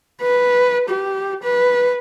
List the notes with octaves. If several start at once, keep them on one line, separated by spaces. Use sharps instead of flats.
B4
G4
B4